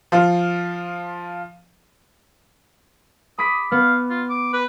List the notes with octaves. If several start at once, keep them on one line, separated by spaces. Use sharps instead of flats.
F3 F4
B5 D6 D#6 B6
B3 F5
F4
D6
B4